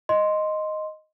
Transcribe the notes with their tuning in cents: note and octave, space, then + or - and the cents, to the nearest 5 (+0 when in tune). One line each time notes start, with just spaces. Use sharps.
D#5 +0 C6 +0